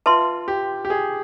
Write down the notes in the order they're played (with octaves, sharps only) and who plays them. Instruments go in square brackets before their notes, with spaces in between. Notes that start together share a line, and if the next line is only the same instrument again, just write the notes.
[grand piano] F4 [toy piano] B4 E5 A5 C6
[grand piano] G4
G4
G#4